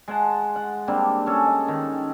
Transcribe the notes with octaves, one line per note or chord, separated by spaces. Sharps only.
G#3 F#5 A5
F#5
G3 A#3 C4 D4
C#4 G#4 A4
D#5
D#3